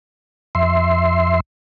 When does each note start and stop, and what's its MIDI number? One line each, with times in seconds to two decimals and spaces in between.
0.55 1.40 41
0.55 1.40 76
0.55 1.40 84